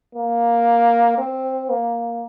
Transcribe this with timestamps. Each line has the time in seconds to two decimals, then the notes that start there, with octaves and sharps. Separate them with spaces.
0.15 A#3
1.18 C4
1.70 A#3